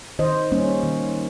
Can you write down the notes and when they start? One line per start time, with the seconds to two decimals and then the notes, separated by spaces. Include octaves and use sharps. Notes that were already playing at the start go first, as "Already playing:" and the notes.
0.19 D#3 C5 D#5
0.52 G3 A#3 C#4
0.83 D#3